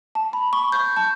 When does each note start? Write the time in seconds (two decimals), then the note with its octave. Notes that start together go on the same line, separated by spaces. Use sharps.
0.15 A5
0.33 B5
0.53 C#6
0.72 G6
0.97 A5